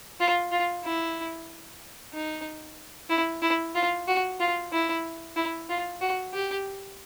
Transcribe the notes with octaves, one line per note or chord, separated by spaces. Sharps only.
F4
F4
E4
D#4
E4
E4
F4
F#4
F4
E4
E4
F4
F#4
G4